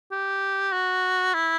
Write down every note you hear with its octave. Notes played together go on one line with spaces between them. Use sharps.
G4
F#4
E4